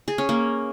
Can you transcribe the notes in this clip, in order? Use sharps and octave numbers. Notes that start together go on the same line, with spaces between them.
G#4
C#4
A#3